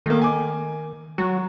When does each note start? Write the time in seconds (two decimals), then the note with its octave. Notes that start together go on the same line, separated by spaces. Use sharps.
0.06 D#3 A3 A#3
0.22 G#5 D6
1.18 F#3 F#4